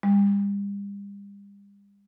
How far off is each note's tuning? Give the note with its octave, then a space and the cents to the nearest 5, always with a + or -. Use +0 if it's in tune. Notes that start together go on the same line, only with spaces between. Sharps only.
G3 +40